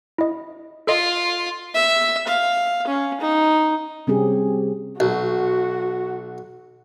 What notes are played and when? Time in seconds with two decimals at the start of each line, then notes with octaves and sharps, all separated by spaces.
0.18 E4 D#5
0.87 F4 A4 D#5
1.74 E5
2.27 F5
2.87 C#4
3.21 D#4
4.07 C3 G3 C4 C#4 G4 G#4
5.00 B1 F#4